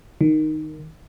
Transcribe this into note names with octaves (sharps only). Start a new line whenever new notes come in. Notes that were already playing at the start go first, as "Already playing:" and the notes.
D#3